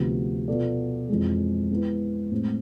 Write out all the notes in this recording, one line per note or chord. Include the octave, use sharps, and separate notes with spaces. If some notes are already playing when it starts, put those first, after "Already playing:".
Already playing: D2 C3 F3 B3
B2 B3 F4 A4 D5
F2 E3 G#3
G#3 B3 E4 B4
A2 G#3 C4